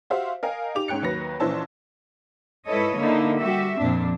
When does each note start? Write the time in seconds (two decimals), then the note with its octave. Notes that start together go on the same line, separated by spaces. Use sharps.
0.10 F#4 G4 C5 E5 F5
0.43 A#4 D#5 F5 G5 G#5
0.75 D#4 G4 D6 F7
0.88 G#2 C#4 G5 F#6 C#7
1.02 D#2 F#3 B4 A#6
1.40 A#1 E3 C#4 C5 A5 E6
2.66 G#2 E4 A4 B4 C#5 D#5
2.97 D3 A#3 D#4 E4
3.39 G3 F#4 G4 E5
3.80 F2 A#2 C4 D4